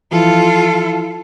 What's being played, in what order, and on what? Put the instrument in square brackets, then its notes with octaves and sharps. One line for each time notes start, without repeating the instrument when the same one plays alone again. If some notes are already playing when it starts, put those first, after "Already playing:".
[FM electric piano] E3 F3 E4 [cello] F4 A4